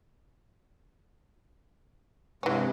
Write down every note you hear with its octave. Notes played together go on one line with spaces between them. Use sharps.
G2 C3 E3 G#3 C#4